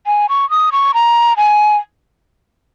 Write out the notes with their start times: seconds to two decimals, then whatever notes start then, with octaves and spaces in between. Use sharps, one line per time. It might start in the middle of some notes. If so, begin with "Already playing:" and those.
0.06 G#5
0.29 C#6
0.50 D#6
0.72 C#6
0.94 A#5
1.37 G#5